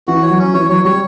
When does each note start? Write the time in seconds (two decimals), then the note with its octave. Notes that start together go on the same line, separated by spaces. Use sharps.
0.07 E3 F#4
0.23 C#5
0.31 F#3
0.39 C#4
0.54 E3 C#5
0.69 F#3 C#5
0.85 G3 C#5